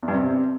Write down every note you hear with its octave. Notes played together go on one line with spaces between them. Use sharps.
E2
G2
C3